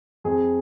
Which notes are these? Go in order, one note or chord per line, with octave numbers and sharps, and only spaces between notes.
F2 G#4